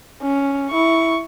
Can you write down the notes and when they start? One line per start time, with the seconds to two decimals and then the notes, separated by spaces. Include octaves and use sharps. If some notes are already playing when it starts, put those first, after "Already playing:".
0.22 C#4
0.70 E4 C#6